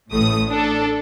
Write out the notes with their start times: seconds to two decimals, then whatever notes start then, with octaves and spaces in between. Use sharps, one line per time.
0.12 A1 A2 A3 D#6
0.50 D4 A4